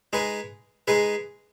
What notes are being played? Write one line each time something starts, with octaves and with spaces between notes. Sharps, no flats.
G#3 D#4 G#4 B4
G#3 D#4 G#4 B4